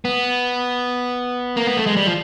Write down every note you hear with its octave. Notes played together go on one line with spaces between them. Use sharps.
B3
A#3
B3
A3
G#3
G3
F3